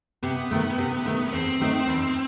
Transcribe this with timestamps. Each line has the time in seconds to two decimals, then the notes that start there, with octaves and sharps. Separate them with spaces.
0.23 C3 B3
0.51 D#3 A3
0.78 C3
1.05 D#3 A3
1.28 B3
1.32 E2 C4
1.60 D#3 A3 D#4
1.88 E2